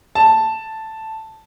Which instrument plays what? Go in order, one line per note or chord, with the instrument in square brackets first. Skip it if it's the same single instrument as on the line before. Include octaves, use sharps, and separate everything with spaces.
[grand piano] A5